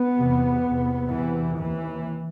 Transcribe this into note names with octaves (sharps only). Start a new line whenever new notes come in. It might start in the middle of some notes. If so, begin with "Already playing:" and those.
Already playing: B3
E2 C3
E2 C3
E2 C3 E3
D#2 E3